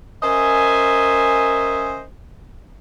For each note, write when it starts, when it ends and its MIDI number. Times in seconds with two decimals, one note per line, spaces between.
0.23 2.03 61
0.23 2.03 70
0.23 2.03 72
0.23 2.03 75
0.23 2.03 76
0.23 2.03 80